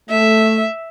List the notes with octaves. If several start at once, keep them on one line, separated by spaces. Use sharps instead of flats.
A3 E5